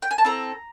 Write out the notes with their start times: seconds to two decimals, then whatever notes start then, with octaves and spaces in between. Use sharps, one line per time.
0.02 G5
0.11 G#5
0.18 A5
0.24 C4 E4 A4 A#5